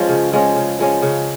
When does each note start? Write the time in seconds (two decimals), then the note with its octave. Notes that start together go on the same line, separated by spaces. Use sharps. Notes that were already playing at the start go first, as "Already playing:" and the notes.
Already playing: F3 G#3 C#4
0.09 C#3
0.32 F3 G#3 C#4
0.56 C#3
0.79 F3 G#3 C#4
1.02 C#3